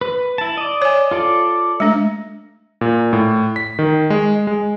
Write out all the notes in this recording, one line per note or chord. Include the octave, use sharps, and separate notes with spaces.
B4
E4 A5
D5 D#5
C#5 G#5
F4 A4 D5
G#3 A3 D4
A#2
A2
B6
D#3
G#3
G#3